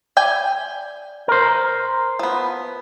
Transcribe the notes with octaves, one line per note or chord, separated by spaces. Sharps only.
D5 G5 G#5
A#4 C5
F3 B3